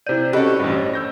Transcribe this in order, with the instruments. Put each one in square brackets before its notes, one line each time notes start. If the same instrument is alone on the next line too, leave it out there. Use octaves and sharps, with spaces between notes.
[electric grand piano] C3 D#7 [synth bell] E4 C5 D5 [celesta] G6
[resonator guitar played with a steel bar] C#4 G4 [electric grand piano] F#4 A4 [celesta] D#5 B5 F#6
[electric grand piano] A1 G2
C#5
E6 G6 A#6